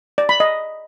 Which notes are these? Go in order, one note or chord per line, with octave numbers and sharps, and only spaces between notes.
D5
B5
D#5